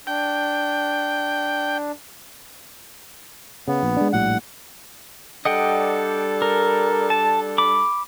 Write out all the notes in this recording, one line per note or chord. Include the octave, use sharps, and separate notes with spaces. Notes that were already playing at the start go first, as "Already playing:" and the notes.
D4 G5
C#3 B3
A#1
G#3 D4
A#1 A2 G3 F#5
G3 D4 A4 D#5 F#5 G5
A#4
A5
B5 D6